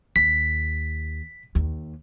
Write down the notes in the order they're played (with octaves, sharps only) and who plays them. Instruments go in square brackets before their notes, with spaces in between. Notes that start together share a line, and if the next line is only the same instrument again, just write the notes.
[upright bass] D#2 [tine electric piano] B6
[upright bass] D#2